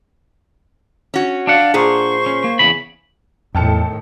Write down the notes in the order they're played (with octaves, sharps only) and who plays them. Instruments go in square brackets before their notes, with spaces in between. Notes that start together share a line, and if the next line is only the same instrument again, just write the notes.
[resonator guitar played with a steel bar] C#4 F#4
[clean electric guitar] D4 F#5 [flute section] D5 F5
[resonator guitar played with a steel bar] A#2 G#4 [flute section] C5 C#6
[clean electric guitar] C#4
A#3
E2 C#3 B5
[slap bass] E2 [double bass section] A2 D#3 [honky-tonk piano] G5 A5 C#7